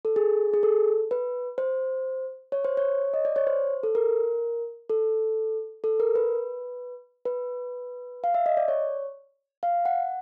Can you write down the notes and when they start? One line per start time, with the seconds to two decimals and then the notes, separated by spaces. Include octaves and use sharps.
0.05 A4
0.16 G#4
0.53 G#4
0.63 A4
1.11 B4
1.58 C5
2.52 C#5
2.64 C5
2.77 C#5
3.14 D#5
3.25 D5
3.36 C#5
3.47 C5
3.83 A4
3.95 A#4
4.89 A4
5.84 A4
6.00 A#4
6.15 B4
7.25 B4
8.24 F5
8.34 E5
8.46 D#5
8.57 D5
8.68 C#5
9.63 F5
9.85 F#5